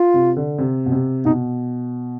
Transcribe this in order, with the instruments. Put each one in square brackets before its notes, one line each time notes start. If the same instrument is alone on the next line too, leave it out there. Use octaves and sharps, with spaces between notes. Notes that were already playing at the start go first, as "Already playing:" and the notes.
Already playing: [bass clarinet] F4
[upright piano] C3
D3
C3
B2
C3
[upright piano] B2 [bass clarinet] D#4